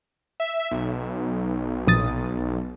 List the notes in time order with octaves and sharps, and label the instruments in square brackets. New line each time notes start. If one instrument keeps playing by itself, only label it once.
[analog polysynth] E5
B1
[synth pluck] A#1 D#6 A6